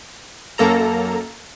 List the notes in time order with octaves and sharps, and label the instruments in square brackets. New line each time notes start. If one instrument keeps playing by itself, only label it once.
[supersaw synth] F#2 A#3 A4 A#5